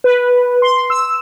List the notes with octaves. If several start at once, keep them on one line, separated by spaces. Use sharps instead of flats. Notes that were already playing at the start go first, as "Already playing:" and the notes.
B4
C6
E6